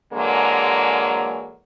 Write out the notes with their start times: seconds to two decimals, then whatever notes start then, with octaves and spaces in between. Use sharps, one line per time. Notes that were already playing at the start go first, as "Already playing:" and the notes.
0.13 D3 E3 F#3 G#3 A#3